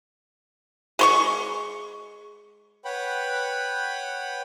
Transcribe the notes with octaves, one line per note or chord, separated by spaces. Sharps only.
G#3 C6 C#6
B4 C#5 F#5 G5 B5